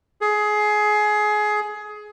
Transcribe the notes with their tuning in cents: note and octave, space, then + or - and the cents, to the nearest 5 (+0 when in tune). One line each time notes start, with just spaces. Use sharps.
G#4 +20